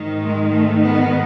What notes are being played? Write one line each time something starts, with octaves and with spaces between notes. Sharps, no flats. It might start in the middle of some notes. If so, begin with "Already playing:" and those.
Already playing: G#2 D#3
G#3
A3
B3